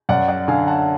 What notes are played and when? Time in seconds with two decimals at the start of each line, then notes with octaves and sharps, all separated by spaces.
0.09 F#2 D5 F#5
0.28 D5 F#5
0.48 D3 F5 G#5
0.67 F#5 A5